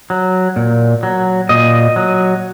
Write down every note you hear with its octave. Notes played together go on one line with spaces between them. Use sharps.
F#3
A#2
F#3
A#2 D#5
F#3